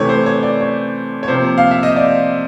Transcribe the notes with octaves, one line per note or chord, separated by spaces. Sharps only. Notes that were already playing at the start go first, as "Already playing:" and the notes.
Already playing: C3 E3 A3 C#5
C5
C#5
D5
C#5
C#5
C3 F3 A#3 C5
F5
E5
D#5
D5